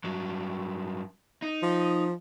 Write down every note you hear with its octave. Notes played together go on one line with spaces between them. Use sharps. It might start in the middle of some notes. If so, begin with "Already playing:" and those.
G2 F#3
D#4
F3